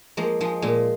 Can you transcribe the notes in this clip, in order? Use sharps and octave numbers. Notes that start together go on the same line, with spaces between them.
F3 G#3 A#3
F3 G#3
A#2 G#3